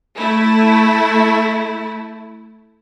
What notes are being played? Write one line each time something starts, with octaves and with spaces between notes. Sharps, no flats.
A3 E4